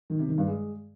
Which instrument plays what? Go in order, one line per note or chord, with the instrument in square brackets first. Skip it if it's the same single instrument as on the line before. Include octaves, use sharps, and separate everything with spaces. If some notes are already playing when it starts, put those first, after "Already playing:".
[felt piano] D#3
C3
D#3
G2
G#3